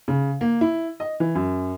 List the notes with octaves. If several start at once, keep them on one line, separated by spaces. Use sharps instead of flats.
C#3
A#3
E4
D#5
E3
F#2